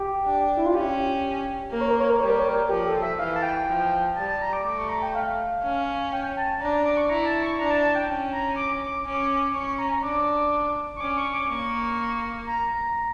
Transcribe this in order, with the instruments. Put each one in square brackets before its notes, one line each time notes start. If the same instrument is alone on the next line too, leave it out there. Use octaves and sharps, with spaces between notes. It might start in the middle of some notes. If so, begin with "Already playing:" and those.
Already playing: [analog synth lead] G4
[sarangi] D4
[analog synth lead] E4
F4
[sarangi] C#4 [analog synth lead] G4
[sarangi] A#3 [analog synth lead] A#4
[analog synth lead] C#5
A#4
C#5
A#4
[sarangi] G3 [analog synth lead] C#5
[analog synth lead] A#4
C#5
A#4
[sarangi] F3 [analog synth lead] G4
[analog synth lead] A4
E5
[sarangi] E3 [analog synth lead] F5
[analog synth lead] A5
G5
[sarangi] F3
[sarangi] G3 [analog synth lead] A5
[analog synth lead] A5
A#5
D6
[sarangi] A3 [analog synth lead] D6
[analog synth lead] C#6
A#5
G5
F5
[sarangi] C#4
[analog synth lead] G5
A5
[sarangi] D4 [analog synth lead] A#5
[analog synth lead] A#5
D6
C#6
[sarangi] E4 [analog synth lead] A#5
[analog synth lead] A5
C#6
[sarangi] D4 [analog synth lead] A#5
[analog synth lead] A5
A5
G5
[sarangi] C#4
[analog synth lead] A#5
D6
D6
[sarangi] C#4
[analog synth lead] D6
[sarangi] C#4 [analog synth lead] C#6
[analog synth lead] C#6
A#5
A#5
[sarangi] D4 [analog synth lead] D6
[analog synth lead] C#6
[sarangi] C#4 [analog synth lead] D6
[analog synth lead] C#6
D6
[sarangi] A#3 [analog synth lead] C#6
[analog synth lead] A#5